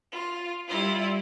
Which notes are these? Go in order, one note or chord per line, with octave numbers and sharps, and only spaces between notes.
F4
G3 E4 F4